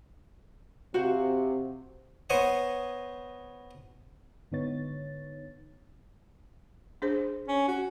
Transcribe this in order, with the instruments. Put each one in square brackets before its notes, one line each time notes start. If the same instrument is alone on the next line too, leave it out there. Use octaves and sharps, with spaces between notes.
[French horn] C3 [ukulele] F#4 C5 F5
[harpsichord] B3 C5 C#5 D#5 F#5 G#5
[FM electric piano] G#2 D3 B3 D#4 C#5 A6
[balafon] D4 G#4 C5
[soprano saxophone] C#4
F#4